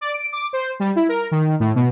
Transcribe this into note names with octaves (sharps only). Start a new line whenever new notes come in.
D5
D7
D6
C5
G3
E4
A#4
D#3
A2
B2